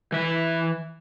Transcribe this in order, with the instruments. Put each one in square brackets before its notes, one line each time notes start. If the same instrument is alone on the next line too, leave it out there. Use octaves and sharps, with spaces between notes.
[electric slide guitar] E3 E5